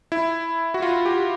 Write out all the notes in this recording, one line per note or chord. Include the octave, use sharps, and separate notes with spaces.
E4
F#4
F4
G4